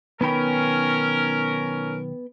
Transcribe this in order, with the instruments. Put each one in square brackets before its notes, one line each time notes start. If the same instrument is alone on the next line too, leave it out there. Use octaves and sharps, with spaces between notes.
[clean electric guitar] B1 D#3 B5 [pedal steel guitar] B3 G5 [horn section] C#4 A#4